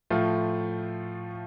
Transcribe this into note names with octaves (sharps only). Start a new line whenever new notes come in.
A2 F3 A3 F4